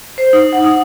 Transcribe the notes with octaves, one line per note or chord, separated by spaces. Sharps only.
C5
D#4
F#5
D#4